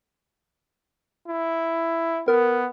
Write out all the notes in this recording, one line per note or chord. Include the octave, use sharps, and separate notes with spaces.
E4
B3 A#4